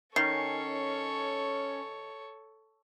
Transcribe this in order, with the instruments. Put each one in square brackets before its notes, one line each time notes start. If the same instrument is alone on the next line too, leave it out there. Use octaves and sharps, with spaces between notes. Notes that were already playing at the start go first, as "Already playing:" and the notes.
[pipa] D#3 [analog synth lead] C#4 [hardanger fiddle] A4 C#5 [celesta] C7